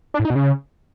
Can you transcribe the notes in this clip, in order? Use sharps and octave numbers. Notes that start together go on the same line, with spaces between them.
D4
A2
D#4
B2
C#3